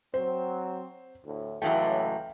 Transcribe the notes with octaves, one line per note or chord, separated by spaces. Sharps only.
F#3 C4 C5
D2 A2
C#2 A2 E3 F#3 A3 F5 G5